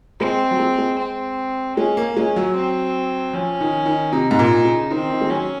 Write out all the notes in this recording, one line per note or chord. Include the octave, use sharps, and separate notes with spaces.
G#3 C4
F#3
G#3
G#3
C4
G#3 C#4
A#3
G#3 C#4
F#3
C4
F3 C#4
D#3
D#3
C3 D#4
G#2
A#2
C#3
D#3 C4
D#3
G#3
F#3 C#4